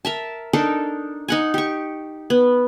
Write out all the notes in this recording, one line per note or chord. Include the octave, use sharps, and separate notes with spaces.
A#4 E5 A5
D4 D#4 A4 A#4
D#4 F#5 G#5
G4 C#6
B3